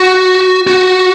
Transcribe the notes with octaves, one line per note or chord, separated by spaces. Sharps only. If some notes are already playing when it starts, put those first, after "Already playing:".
Already playing: F#4
F#4